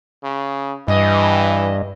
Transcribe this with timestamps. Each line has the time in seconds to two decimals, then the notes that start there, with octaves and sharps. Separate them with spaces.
0.24 C#3
0.88 G2 E3 D#5